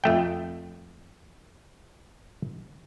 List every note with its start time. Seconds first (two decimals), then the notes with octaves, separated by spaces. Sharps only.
0.04 F2 A3 G5